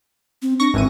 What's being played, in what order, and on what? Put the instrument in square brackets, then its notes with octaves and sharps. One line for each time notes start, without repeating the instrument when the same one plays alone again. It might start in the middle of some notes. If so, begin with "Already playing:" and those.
[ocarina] C4
[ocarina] D4 [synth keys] C#6 A#6
[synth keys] G#1 E3 D#7 [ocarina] C4